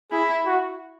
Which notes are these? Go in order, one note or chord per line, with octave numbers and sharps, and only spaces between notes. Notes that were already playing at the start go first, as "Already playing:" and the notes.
E4 G#4
F#4